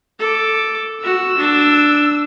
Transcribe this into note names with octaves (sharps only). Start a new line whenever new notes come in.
A4 D6
F#4 E6
D4